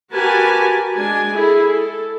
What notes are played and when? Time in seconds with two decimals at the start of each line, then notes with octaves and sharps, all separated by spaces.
0.12 F#4 G4 A#4 B4 G#5 A5
0.96 G#3 D4 G#5
1.32 E4 G#4 A4
1.68 A4